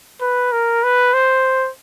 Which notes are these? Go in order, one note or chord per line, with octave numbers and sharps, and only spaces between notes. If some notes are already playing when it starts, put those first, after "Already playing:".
B4
A#4
B4
C5